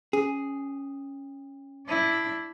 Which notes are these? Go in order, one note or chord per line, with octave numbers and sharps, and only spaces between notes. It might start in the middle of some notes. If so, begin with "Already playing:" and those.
C#4 G#4
D4 E4